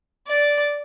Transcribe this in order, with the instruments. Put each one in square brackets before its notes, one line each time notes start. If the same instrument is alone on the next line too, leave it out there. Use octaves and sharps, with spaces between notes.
[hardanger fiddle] D5